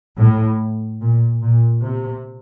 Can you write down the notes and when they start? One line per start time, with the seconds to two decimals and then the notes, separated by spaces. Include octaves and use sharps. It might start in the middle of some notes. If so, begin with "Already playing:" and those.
0.18 A2
1.01 A#2
1.42 A#2
1.84 C3